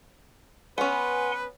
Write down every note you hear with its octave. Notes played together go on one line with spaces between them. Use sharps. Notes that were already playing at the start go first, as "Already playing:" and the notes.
B3 C#4 B4 F#5 G#5 C6